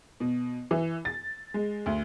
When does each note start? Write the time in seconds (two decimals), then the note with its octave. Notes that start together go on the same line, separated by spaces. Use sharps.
0.20 B2
0.71 E3
1.05 A6
1.54 G#3
1.86 D2